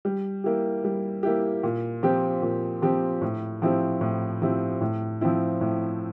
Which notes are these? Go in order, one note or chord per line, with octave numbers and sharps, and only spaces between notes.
G3
A#3 E4 G4
G3
A#3 E4 G4
A#2
F3 C4 G4
A#2
F3 C4 G4
A2
F3 C4 E4 G4
A2
F3 C4 E4 G4
A2
F3 C4 E4
A2